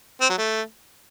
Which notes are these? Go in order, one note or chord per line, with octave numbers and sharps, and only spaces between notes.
C4
F#3
A3